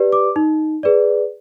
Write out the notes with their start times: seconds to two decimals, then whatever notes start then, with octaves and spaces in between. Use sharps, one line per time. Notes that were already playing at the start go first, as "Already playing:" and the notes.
Already playing: G4 B4 D5
0.12 D6
0.36 D#4
0.83 G#4 B4 D5